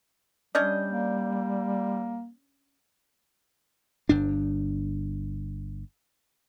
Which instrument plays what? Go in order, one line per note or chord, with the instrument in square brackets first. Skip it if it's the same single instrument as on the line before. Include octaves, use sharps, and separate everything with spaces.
[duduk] G3 [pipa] C#4 D4 D#5 [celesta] D5 G6
[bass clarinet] A#3
[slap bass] G1 G2 D4